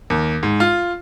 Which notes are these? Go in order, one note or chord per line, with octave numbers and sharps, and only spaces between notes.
D#2
G#2
F4